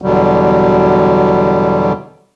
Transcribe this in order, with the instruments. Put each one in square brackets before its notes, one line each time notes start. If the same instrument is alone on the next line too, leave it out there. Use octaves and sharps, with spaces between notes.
[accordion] E2 B2 D3 F#3 G3